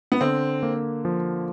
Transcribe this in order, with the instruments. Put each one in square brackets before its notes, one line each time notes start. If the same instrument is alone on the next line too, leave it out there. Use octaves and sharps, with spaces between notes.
[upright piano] B3
[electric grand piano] D3 [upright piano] C4
[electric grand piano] A#3
F3